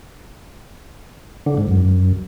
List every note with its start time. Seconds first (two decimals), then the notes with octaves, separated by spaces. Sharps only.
1.46 D3
1.57 G#2
1.69 F#2